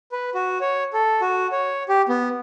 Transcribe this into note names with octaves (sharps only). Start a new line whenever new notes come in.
B4
F#4
C#5
A4
F#4
C#5
G4
B3